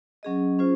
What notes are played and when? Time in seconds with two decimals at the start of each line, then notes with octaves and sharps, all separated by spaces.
0.23 F#3 C#4 G#4 D#5
0.59 C#4 F4 G#4 C5